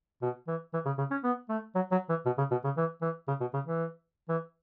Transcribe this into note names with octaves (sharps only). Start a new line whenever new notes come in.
B2
E3
E3
C#3
C#3
C#4
B3
A3
F#3
F#3
E3
B2
C#3
B2
C#3
E3
E3
C#3
B2
C#3
E3
E3